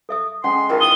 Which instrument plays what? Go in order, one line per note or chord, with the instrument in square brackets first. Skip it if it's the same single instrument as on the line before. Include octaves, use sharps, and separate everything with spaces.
[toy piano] A4 E5 D#6
[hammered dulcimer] G#3 [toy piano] C#4 F#5 G5 [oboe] C6
[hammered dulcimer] D#3 E3 F4 [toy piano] A#4 G5
[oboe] D#6 [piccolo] G7